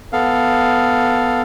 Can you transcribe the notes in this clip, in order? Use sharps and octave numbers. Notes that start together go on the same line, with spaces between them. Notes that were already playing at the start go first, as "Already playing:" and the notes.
B3 A4 F5